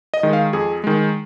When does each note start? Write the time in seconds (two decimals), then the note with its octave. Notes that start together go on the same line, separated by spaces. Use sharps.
0.14 D#5
0.23 D#3 G#3
0.33 F5
0.53 F2 G#4
0.84 D#3 G#3